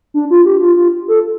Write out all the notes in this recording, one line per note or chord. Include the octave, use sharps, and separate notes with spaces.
D4
F4
G4
F4
F4
A4